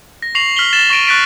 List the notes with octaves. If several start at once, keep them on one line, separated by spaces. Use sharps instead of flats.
A#6
C#6 A#6 C7 F7 F#7
F6 B6 F#7 G7
A6 E7
C#6 A#6 D7 D#7
C#6 F#6 A6 B6 D7